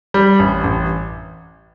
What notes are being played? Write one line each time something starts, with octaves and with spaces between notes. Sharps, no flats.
G3
A1
A1